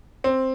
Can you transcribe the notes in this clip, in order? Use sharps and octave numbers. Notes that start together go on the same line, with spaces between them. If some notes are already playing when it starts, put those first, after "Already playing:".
C4